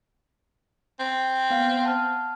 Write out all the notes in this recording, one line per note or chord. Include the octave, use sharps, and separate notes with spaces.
C4
B3 F5 F#5
F#5 A5 F6